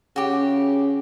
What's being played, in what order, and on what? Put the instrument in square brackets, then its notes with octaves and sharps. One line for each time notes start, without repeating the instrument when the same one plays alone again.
[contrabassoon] C#3 [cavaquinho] F#4 G4